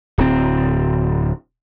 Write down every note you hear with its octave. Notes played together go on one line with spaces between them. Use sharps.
D1 C4